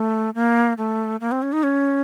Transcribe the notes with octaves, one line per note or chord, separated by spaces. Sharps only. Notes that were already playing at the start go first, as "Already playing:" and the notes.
Already playing: A3
A#3
A3
A#3
C4
C#4
D#4
C#4